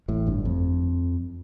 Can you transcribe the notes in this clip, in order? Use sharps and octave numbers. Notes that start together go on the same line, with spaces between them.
A1 A2
G1 G2
F2